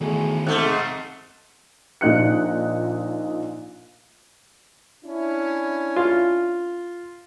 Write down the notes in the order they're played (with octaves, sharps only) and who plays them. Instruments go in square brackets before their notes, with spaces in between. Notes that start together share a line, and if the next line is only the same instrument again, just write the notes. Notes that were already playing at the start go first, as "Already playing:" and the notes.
[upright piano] E2 A3 G#4 [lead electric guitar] D#3 F#4
[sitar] G#2 A3 [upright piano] C4 F#6
[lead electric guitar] G#4 F5
[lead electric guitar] C4 A5 [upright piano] C7
[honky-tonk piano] A#1 A#2 D#4 F#6 C#7
[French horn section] C#4 D4 E4
[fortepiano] F4